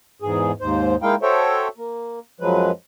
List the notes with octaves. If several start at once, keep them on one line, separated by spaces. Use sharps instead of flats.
E2 G#2 G#4
D#2 G#2 C5
G#3 A#3 D#4 E4 F5 G5
F#4 A4 C5 C#5 E5 G5
A#3
F#2 F3 F#3 G#3 B4